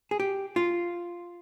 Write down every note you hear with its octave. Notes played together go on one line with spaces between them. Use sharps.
G#4
G4
F4